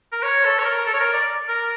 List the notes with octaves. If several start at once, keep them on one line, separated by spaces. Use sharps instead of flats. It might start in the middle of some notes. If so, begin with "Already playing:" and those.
A#4
C#5
A4
C#5
A#4
A4
C#5
A#4
D5
A#4